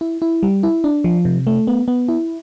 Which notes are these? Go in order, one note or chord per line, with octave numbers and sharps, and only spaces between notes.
E4
E4
G3
E4
D4
F3
C3
A3
B3
B3
E4